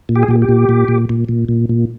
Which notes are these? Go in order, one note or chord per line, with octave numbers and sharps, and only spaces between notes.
A#2
G4
G#4
A#2 G4
G4
A#2
A#2
A#2
A#2
A#2
A#2
A#2